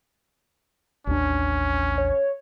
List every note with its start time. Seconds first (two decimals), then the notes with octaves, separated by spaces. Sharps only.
1.07 A1 D#2 C#4 D4
1.98 C#5